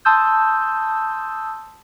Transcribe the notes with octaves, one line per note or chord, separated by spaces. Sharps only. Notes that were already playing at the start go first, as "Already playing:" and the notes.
A5 C6 D#6 E6 G6